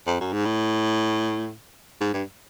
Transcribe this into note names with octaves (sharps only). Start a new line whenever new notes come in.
F2
F#2
G#2
A2
G#2
G2